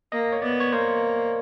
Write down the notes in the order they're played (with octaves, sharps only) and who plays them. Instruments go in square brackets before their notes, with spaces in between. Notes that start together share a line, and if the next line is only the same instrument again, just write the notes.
[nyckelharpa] A#3 [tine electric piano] D#5
[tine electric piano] C#5
[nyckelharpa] B3 [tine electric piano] D5
[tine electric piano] C#5
[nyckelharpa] A#3 [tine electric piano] C5